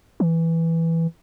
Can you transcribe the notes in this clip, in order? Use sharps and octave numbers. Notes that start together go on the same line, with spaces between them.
E3